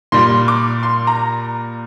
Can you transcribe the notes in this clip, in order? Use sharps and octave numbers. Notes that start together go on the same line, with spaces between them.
A#2 G3 C6
D6
C6
A#5